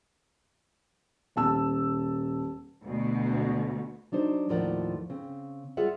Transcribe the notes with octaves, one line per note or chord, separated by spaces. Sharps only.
D#1 A5 E6
D2 B2
F#3 D4 D#4 C5
D#2 A2 F3 A#4 D5 F#5
C#3 C4
G3 F4 G#4 E5 F#5